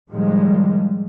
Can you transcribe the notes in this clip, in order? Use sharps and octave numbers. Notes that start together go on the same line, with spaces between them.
A2 D#3 F3 G3 G#3